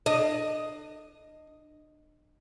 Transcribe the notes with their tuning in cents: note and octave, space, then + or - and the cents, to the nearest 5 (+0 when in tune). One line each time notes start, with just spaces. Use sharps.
D4 +35 D#5 +0